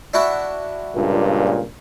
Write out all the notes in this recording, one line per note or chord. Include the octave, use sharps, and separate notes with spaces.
D4 E4 F#4
C#2 G2 A#2